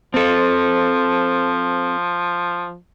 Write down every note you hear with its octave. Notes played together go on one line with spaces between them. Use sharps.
F3 C4 A4